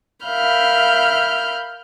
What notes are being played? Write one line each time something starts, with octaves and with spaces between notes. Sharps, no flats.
A#4 E5 F5 B5 F6 G6